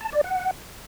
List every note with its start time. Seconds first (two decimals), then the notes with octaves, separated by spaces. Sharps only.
0.01 A5
0.12 D5
0.24 F#5